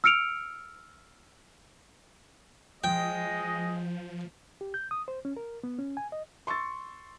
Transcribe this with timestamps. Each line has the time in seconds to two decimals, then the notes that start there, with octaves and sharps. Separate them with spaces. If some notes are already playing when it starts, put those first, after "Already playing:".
0.04 E6 F6 C#7 D7 F7
2.84 F3 G#3 D#5 G5
4.61 G4
4.74 G6
4.91 D#6
5.08 C5
5.25 C#4
5.37 A#4
5.64 B3
5.79 C#4
5.97 G#5
6.12 D#5
6.47 C6 C#6 E6 A6